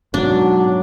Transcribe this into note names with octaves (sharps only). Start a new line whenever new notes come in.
G#2 B2 F#3 D4